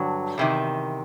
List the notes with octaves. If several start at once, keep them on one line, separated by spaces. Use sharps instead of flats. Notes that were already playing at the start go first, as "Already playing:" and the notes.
Already playing: G2 D3 F#3
E2 C3 D#3